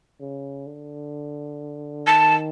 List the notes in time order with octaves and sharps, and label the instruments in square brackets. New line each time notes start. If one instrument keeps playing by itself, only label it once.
[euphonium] C#3
D3
[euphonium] D#3 [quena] A5